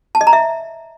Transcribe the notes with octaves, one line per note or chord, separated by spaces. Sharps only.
A5
D#5
A#5
E5